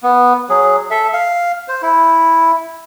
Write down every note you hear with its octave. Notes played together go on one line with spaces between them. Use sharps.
B3
F#3 G#4
A4 E5
F5
C5
E4